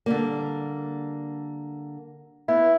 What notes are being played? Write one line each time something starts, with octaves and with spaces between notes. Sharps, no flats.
D3 G3 A#3
B3 E4